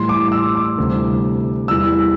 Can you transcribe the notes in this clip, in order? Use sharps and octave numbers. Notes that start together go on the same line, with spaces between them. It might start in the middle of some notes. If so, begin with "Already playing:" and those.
Already playing: A2 E3 G3 C6
D6
D6
E6
D6
D2 C3 E3 G3
E2 E3 G3 E6